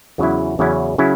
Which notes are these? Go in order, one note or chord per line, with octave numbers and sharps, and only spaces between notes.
E2 C#3 F#3 C#4 E4
E2 C#3 F#3 C#4 E4
C#3 F#3 C#4 E4